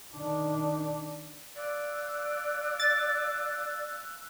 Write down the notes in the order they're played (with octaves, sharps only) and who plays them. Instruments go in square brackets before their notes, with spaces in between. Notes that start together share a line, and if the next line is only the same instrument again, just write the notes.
[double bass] D#3 D4
[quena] D5 [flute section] F5 E6 F#6
[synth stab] A6